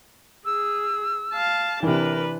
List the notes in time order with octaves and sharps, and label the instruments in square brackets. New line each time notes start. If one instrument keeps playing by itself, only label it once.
[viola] G#4 [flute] E6
[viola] F5 A5
[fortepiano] C3 E3 [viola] D4 B4 [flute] A#4